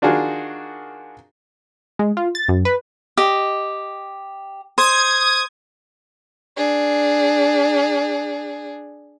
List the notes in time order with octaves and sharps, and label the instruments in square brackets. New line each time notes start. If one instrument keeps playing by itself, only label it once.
[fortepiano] D#3 D4 F4 F#4 G#4 A#4
[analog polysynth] G#3
F4
A6
F#2
B4
[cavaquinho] G4 D#5
[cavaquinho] C5 [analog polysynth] D#6 G#6
[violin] D4 G#4